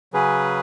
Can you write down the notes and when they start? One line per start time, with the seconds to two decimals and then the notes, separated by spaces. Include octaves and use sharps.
0.13 C#3 F#3 C#4 G#4 B4